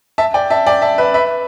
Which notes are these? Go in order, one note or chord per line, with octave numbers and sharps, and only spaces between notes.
E5 A5
D5 G5
E5 A5
D5 G5
E5 A5
B4 E5
B4 E5